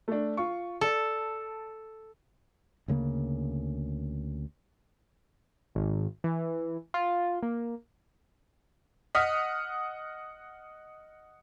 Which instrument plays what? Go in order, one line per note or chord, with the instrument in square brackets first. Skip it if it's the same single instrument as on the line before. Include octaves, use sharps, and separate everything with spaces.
[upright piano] A3 D4
F4 C#6
[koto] A4 [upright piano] D5 A5
[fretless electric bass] D2 C#3 G#3 A#3
[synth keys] G#1
E3
F4
A#3
[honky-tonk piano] D#5 F#5 D#6 F6 B6